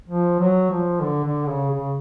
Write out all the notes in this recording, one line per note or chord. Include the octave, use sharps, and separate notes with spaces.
F3
F#3
F3
D3
D3
C#3
C#3